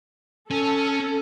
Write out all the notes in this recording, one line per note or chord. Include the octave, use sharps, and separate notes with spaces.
C#4 A4